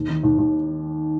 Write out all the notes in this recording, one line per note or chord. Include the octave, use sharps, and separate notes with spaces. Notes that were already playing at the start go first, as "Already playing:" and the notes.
Already playing: D#2
D#3
D#2
D#2